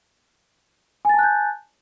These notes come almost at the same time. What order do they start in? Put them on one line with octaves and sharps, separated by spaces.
G#5 A6 A5 F#6 G6